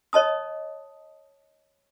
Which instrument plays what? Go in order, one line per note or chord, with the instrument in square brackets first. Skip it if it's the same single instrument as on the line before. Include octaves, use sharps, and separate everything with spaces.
[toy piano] C#5 D#5 A5 D#6